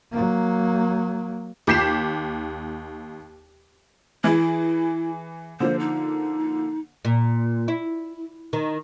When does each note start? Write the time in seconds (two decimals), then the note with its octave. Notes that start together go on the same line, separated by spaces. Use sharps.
0.11 F#3 A#3
1.67 D#2 D6 G6 B6 C7 E7
4.24 E3 E4 G#4
5.60 D3 F3 A#3 C5
5.79 D#4
7.05 A#2
7.68 E4
8.53 D#3